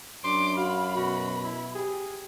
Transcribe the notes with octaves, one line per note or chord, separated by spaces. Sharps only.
F#2 D4 C6 D6
F#4 F5 B5
B2 F#4
E4
G4 G#4